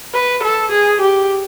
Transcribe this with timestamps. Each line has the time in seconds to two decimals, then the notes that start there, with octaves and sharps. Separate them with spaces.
0.14 B4
0.43 A4
0.72 G#4
1.01 G4